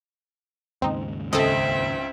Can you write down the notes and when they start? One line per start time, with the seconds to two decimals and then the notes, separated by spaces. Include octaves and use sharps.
0.82 D#2 G#2 C#3 C4 D#4
1.33 C#2 C4 A4 D#5 E5